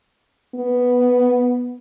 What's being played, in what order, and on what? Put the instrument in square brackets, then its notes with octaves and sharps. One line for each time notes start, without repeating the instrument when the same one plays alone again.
[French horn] B3